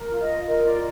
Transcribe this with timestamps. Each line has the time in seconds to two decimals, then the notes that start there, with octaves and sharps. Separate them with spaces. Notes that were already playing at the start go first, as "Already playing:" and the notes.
Already playing: A#4
0.11 F4
0.20 D#5
0.29 F4
0.47 A#4 D#5
0.65 F4 D5